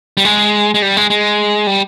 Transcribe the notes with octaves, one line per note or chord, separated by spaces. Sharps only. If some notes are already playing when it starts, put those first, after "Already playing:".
G3
G#3
G#3
G3
G#3
G#3
G3